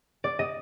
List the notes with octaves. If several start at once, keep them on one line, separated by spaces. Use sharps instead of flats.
D5
D#5